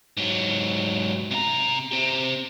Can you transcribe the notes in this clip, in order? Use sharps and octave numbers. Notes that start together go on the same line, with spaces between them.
G#2 F#3
C3 A#5
C4 G4